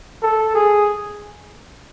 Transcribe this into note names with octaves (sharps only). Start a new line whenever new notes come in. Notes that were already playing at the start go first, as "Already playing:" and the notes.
A4
G#4